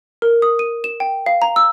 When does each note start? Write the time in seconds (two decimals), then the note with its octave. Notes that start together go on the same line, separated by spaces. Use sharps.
0.22 A#4
0.42 D#6
0.59 D#7
0.84 E7
1.00 G5
1.26 F5
1.42 A#5
1.56 E6